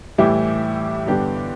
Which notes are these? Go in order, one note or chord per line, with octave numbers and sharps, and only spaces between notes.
A2 E3 G3 E4 G4
G2 D3 B3 D4 G4